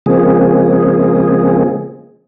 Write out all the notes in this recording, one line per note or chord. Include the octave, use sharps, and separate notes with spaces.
C#3 F3 G#3 A#3 C4 G#4